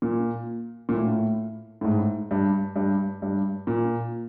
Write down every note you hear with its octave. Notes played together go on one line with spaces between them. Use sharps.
A#2
A#2
A2
A2
G#2
G2
G2
G2
A#2